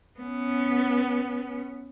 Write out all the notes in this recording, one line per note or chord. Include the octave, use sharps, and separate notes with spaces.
B3 C#4